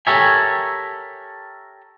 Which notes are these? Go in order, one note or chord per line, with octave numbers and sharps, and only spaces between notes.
G4 A4 A#4 C#5 E5 G#5